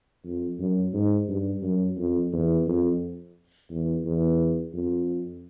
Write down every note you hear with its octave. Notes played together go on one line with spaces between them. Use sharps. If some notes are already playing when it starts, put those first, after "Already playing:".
F2
F#2
G#2
G2
F#2
F2
E2
F2
E2
E2
F2